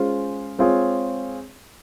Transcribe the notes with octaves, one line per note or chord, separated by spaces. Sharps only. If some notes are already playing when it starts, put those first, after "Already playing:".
Already playing: G#3 C#4 F4 C5
G#3 C4 F4 G#4 C#5